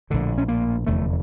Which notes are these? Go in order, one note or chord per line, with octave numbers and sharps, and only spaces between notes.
A#1 A2 D3
C#4
A#3
F1 E2 D3 A3